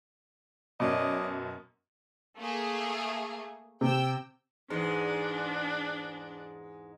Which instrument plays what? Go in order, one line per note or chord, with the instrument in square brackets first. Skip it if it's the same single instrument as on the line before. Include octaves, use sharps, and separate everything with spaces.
[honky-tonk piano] F#2 B2 [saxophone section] C#4 D5 D#5
[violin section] A3 A#3 G#4
[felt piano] C3 [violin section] G5 E6
[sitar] E2 G#2 G#3 [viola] D4